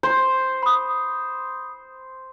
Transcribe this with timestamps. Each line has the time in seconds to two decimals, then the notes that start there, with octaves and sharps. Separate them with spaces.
0.03 C5
0.63 B5 D#6